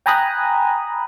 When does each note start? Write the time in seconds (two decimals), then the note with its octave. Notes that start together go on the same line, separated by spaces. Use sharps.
0.06 G5 G#5 A#5 B5 D#6 F#6